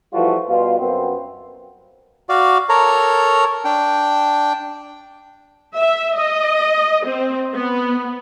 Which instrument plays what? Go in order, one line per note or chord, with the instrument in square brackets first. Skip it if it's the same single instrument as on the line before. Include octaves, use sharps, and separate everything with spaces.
[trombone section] E3 F3 G3 A3 F4 F#4
B2 G3 B3 F4
F#2 B3 C4
[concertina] F#4 D5 F5
A4 A#4 C#5 A#5
D4 G5
[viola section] E5
D#5
C4
B3